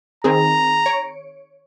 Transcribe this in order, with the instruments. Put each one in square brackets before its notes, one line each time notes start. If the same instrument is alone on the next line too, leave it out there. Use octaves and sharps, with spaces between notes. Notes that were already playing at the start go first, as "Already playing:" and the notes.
[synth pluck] D#3 C4 G#4 [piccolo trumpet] A#5
[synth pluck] C#5 C#7 D7